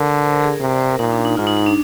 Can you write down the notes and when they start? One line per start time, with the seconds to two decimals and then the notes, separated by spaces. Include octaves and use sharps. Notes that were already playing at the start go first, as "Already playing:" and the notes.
Already playing: D3 A#4
0.23 C5
0.32 A#4
0.42 G#4
0.51 A#4
0.60 C3 C5
0.70 D5
0.80 C5
0.89 A#4
0.99 A#2 D#4
1.12 D4
1.25 D#4
1.37 G#2 F4
1.47 D#4
1.57 D#4
1.66 D4